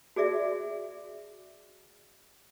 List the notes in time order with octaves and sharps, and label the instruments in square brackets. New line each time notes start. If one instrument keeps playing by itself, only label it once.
[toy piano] F#4 G#4 D5 E5